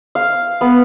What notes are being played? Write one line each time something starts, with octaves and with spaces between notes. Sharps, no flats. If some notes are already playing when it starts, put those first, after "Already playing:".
F5
B3